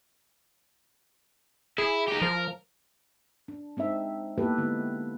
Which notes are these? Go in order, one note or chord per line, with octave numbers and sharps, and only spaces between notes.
E4 G#4
D#4 G4
F3 A#4
D4
G#3 C4 D#4 E5
A#3 B3 E4 G4 A4 B4
D3 G#3 B3 E4